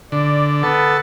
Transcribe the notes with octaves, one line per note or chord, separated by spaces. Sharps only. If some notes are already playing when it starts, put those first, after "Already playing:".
D3 D5
B3 A4